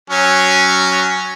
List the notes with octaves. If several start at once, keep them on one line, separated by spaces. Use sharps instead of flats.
F#3 C#4